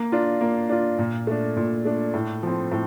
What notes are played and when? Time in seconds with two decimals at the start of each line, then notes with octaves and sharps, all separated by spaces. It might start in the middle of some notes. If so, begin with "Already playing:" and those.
Already playing: A#3
0.12 D4 F4
0.41 A#3
0.69 D4 F4
0.98 A#2
1.27 A3 D4
1.57 A#2
1.85 A3 D4
2.14 A2
2.43 F3 C4
2.72 A2